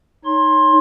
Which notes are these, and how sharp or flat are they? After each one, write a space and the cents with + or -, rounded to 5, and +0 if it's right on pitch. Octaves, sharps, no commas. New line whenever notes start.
D#4 +0 C#5 +0 C6 +20